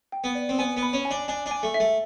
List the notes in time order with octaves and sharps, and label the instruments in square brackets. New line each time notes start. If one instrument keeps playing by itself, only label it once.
[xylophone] G5
[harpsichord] B3
[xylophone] D5
[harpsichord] C4
[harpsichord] B3 [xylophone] G#5
[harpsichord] B3
[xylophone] B5
[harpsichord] C#4
[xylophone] G#5
[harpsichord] D4
[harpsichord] D4 [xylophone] G#5
[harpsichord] D4
[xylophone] G#5
[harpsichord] A3
[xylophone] E5
[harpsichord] A3